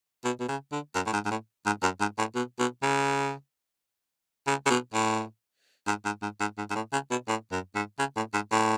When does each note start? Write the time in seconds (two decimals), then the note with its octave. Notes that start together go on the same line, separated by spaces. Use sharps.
0.24 B2
0.40 B2
0.48 C#3
0.72 D3
0.95 F#2
1.06 A2
1.13 G#2
1.26 G#2
1.31 A2
1.66 G#2
1.83 F#2
2.00 G#2
2.18 A2
2.35 B2
2.59 B2
2.83 C#3
4.47 C#3
4.66 C#3
4.70 B2
4.94 A2
5.87 G#2
6.05 G#2
6.22 G#2
6.40 G#2
6.57 G#2
6.70 G#2
6.75 A2
6.93 C#3
7.11 B2
7.28 A2
7.51 F#2
7.75 G#2
7.99 C#3
8.17 A2
8.34 G#2
8.51 A2